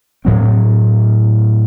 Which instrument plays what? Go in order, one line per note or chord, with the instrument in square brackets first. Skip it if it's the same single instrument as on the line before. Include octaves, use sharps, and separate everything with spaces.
[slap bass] A2 F#3 C4